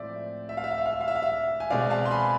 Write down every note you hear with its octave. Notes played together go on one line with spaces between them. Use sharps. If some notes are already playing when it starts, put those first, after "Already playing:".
Already playing: A2 F3 G#3 C4 D5 E5
E5
F5
E5
F5
E5
F5
E5
F5
E5
F5
E5
G#5
B2 G#3 C4 D5 F5
F5 A5
C6
G#5 B5